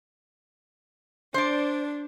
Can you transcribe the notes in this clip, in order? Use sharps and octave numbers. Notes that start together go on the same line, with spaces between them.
D4 C5 D5